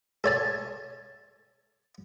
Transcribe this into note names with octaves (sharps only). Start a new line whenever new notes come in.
A4 C#5 A5